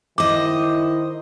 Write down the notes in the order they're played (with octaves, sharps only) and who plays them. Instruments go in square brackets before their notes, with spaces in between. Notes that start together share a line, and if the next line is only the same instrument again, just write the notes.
[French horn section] D#3 E4 [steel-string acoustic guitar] C5 D#5 [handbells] D6